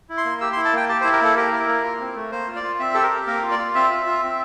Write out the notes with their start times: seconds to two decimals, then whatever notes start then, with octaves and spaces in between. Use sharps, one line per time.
0.09 E4
0.17 C6
0.25 A#3
0.41 G4 E6
0.53 C6
0.57 E4
0.65 A5
0.73 A#3 G5
0.89 G4 A5
1.01 C5
1.04 E4
1.12 A#4
1.21 A#3 A4
1.36 G4 A#4
1.53 E4
1.68 A#3
1.84 F4
2.00 C4
2.16 A3
2.32 A#3 C5
2.48 F4
2.56 D5
2.63 F4
2.79 C4 E5
2.94 G4 A4
3.03 A#4
3.11 G4
3.27 A#3 A#4
3.42 F4
3.51 D5
3.59 F4
3.75 C4 E5
3.90 F4
4.06 F4
4.23 C4